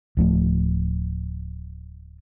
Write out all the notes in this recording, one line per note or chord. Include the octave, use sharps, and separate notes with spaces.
D1 F3 A3